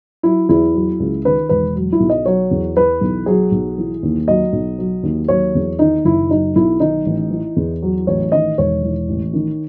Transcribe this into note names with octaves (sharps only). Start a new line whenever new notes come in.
F#3 E4
E2 E4
F#3
C#2
D#3 B4
E1 B4
F#3
E4
B1
D#5
F#3 C#5
E2
E3 B4
B1
F#3 G#4
B1
E3
D#2
F#3 D#5
B1
F#3
D#2
F#3 C#5
E2
D#3 D#4
F#1 E4
F#3 D#4
B1 E4
D#3 D#4
A1
E3
E2
F#3
A1 C#5
D#3 D#5
E1 C#5
E3
A1
D#3